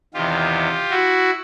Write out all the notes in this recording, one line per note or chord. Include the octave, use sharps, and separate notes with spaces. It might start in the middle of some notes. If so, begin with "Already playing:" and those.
E2 C3 D#3 F4 G4
E4 F#4